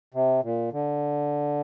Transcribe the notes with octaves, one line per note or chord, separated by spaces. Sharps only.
C3
A#2
D3